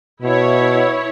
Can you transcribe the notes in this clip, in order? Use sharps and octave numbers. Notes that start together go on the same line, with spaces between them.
B2 E4 C#5